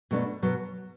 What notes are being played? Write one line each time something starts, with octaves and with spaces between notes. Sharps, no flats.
B2 F#3 A3 D4
B2 F#3